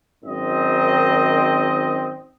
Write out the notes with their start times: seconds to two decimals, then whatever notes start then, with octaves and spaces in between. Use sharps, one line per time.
0.24 G#1 F#2 D#3 C4 D#5